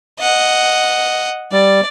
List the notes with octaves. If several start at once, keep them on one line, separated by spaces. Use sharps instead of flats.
D#5 F#5
G3 D5